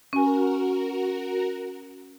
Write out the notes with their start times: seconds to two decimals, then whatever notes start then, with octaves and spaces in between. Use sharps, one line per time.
0.13 C#4 F#4 A#4 G#5